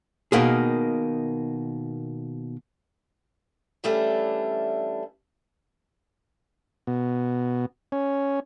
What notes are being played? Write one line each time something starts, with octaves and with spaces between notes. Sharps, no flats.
B2 D#3 A#3 G#4
E3 G3 A3 C#4 D4
B2
C#4